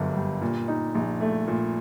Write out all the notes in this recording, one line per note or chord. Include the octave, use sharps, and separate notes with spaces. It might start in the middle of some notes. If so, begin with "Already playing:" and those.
Already playing: G1 F#2 D3
G3
A#2
D#4
A#1
A3
A#2